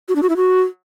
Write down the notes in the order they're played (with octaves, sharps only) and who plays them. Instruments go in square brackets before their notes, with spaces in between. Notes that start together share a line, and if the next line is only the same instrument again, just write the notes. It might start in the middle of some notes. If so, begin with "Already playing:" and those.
[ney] F#4
D4
F#4
E4
F#4